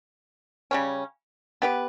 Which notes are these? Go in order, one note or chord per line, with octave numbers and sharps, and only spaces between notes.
C#3 G3 C#4
B3 G4 B4